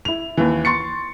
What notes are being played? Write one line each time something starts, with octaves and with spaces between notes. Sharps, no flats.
E4 F7
D#2 E3
C6 C#6 A6 C#7